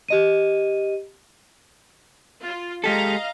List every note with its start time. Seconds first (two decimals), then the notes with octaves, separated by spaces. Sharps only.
0.08 G4 D#5 D#7
2.42 F4
2.84 G#3 G4 A4 D#5 F5 A#5